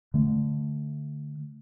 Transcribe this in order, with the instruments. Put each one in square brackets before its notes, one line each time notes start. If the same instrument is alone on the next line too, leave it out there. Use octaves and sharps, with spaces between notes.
[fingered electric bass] D3 A3